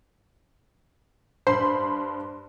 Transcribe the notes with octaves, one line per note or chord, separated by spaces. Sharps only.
G2 C5 B5 C6